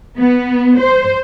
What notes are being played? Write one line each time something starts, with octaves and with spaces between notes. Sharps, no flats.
B3
C5